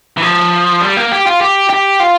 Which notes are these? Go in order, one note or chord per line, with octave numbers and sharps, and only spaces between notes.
E3
F3
G3
A#3
G4
F4
G4
G4
F4